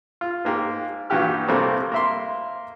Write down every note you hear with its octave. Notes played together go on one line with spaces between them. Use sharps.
F4
G#2 A#3 G4
G2 A#2 E3 F#4 G4 F6
C3 G3 A3 A#3
A#3 E5 C6